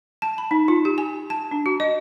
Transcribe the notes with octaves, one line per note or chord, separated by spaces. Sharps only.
A5
B5
D#4
F4
G4
G#5
A5
D4
F#4
D#5